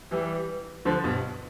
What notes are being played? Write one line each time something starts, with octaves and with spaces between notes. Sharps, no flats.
E3 G3
D3 F3
G2 B2